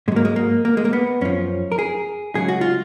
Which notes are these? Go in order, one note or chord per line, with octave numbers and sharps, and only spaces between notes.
G#2 F#3 G#3 A#3
G#3
A#3
A#3
G#3
A#3
B3
F#2 F3 C#4
A#4
G#4
C#2 C#3 F#3 G#4
F#4
F4